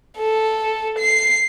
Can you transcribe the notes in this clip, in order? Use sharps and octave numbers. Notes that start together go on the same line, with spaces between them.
A4
C7